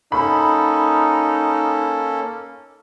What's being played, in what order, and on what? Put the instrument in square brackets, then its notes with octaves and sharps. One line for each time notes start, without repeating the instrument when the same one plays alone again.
[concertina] A#3 C#4 A4 [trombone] D#4 [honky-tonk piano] B5